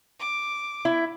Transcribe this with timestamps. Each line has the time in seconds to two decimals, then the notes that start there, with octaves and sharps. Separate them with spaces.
0.19 D6
0.85 E4